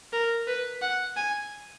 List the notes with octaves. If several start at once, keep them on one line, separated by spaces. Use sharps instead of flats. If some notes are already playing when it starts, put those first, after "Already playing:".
A#4
B4
F#5
G#5